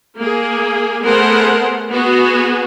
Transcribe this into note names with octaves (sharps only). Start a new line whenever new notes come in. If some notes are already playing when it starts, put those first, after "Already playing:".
A#3 G#4
A3 B3 G#4 A#4 C5 F#5
B3 F#4 G#4